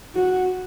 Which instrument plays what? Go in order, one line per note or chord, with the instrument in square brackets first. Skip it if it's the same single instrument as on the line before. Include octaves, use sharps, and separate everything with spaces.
[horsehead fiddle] F#4